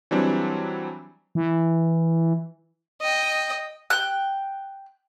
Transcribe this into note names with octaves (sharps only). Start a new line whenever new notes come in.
E3 F#3 G3 C4 D4
E3
D#5 G5
G5 F#6